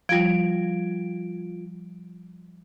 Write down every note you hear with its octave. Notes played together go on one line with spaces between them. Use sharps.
F3 G3 F4 D7